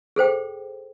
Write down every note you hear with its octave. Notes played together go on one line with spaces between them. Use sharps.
G#4 A4 C5 G5